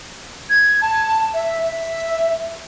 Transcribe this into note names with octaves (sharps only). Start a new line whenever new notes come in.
G#6
A5
E5
E5